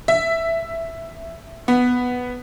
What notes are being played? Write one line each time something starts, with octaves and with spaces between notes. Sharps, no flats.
E5
B3